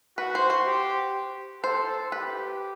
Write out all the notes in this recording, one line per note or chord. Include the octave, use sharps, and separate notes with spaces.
F#4 B4
C5
C5
G4
A4 C5
G4 B4